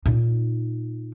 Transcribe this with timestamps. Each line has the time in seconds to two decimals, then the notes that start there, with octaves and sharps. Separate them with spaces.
0.06 A#2 D#4